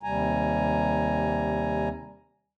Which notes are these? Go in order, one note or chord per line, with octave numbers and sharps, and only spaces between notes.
D#2 C3 G3 G#5 A#5